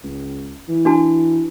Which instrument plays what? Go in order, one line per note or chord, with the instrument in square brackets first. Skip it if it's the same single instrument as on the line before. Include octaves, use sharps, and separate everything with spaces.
[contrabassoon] C#2
E3
[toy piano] D4 F#4 A5